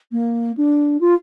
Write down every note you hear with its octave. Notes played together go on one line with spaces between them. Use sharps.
A#3
D4
F4